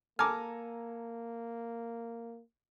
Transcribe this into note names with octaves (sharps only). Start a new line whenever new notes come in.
A#3 A4 G#5 A#5 D6 F6